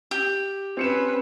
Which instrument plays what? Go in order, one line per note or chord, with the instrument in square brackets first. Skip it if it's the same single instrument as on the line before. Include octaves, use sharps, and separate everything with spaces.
[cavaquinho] G4
[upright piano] C4 C#7 E7 [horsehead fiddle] C#4 B4